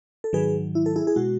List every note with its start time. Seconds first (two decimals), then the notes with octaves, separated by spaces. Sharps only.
0.24 A4
0.33 G#2 D#3 F#3 G#4 B4
0.75 E4
0.86 A4
0.96 E4 G#4
1.07 G#4
1.16 B2 G#3 F#4